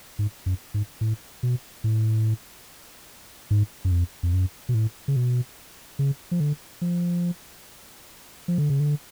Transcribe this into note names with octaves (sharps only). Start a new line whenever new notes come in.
G#2
F#2
G#2
A2
B2
A2
G#2
F#2
F2
F2
F#2
B2
A2
C#3
B2
C#3
F3
D3
F3
F3
D3
C#3
D3